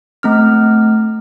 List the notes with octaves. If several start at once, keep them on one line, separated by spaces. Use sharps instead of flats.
A3 C4 F6